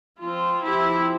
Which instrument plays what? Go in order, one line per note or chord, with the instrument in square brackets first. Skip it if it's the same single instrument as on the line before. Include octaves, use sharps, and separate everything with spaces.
[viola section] F3 C4 F4
E4 G4